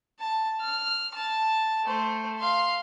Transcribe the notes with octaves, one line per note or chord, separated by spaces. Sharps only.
A5
F6
A5
A3 C5
F5 C6